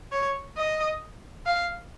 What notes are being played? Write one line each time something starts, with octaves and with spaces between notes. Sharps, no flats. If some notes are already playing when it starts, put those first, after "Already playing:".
C#5
D#5
F5